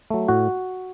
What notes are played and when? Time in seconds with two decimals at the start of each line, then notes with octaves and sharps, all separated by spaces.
0.10 F#3 A3
0.28 A2 F#4